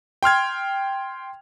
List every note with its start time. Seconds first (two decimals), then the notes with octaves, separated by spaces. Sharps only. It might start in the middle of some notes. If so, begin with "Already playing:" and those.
0.23 G5 C6 F6 G#6